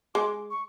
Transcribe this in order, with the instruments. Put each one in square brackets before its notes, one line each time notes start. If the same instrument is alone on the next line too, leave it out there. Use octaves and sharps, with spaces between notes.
[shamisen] G#3 [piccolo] D6
[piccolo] C#6